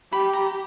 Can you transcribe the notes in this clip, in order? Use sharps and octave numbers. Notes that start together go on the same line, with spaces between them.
G4 B5
A#5